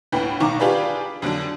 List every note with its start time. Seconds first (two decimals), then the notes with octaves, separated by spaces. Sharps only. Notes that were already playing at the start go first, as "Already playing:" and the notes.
0.12 G1 D2 A2 B4 G5 B5
0.40 B1 D#3 A#5 C#6 D6
0.59 D4 F4 G4 G#4 B4 D5
1.22 F2 D3 F#3 D4